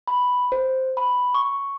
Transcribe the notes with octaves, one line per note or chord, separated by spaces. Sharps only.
B5
C5
B5
C#6